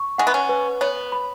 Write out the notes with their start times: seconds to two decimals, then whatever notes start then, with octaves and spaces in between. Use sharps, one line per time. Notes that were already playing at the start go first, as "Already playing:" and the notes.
Already playing: C#6
0.18 G#3 F#5
0.27 B3
0.34 C#4
0.49 B4
0.81 B3 C#5
1.12 B5